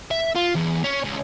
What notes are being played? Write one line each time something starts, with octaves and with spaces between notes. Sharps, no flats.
E5
F4
E2
C#4
C#2